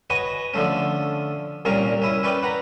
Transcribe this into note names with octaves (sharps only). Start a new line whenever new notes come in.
F#4 B4 C#5 D#5 G#5
D3 F3 A3 C#4
C2 A#2 C#4 A#4 C#6
C#4 E4 D#6
C#4 B4 C#5 D5 G5
B4 F#5 A#5 B5